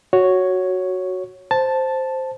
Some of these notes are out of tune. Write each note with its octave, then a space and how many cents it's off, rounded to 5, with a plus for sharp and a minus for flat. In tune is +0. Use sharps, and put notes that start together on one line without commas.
F#4 +0 C#5 +0
C5 +0 A5 +0